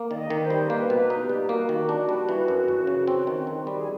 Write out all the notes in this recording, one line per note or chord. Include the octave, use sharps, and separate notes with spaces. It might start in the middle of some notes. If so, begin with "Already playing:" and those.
Already playing: A#3
D#3 D5
D#5
D#3
B4
C5
G3
A#3 B4
B2
B4
D#4
G4
G3
A#3 F#4
D#3
D4
G3
E3
F#2
F#2
C#3
C4
D#3
D#3
G3
G#4